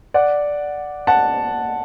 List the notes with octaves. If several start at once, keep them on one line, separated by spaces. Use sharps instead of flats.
D5 F#5
F#5 A5